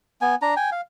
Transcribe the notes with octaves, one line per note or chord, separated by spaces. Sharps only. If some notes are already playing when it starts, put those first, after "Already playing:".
B3 G#5
D4 A#5
G5 G#5
F5